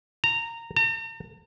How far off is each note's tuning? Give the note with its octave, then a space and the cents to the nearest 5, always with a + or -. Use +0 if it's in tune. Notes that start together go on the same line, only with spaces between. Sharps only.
A#5 -15
A#5 -45